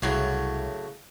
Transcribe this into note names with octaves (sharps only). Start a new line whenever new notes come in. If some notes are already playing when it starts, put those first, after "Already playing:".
C2 A2 C#3 E3 F#3 A3